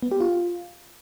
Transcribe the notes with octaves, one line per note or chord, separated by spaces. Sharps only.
B3
G4
F4